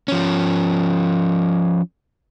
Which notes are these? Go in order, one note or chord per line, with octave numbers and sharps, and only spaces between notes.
F3 C#4